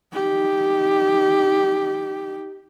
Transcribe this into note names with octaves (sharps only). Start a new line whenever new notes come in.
D#4 G4